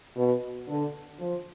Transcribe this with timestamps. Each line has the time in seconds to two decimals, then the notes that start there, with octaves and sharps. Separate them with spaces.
0.16 B2
0.68 D3
1.20 F3